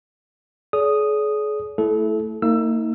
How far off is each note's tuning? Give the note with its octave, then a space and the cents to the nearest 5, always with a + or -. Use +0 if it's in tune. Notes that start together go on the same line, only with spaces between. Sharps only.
G#4 +40 D5 -45 D#6 -5
A3 +5 E4 +0 A4 -30
A#3 -35 D#4 +35 E6 +20